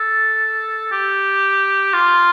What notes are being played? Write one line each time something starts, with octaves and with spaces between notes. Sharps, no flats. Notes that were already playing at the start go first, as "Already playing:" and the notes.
Already playing: A4
G4
F4